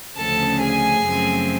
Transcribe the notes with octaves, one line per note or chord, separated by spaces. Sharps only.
D2 C#3 F3 A3 C#4 A4 A5
G#4 G#5
F#2 C#3 F3 A3 C4